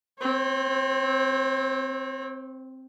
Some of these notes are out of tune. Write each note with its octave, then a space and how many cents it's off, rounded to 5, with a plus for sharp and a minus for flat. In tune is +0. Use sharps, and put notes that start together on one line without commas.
C4 +0 C#5 -45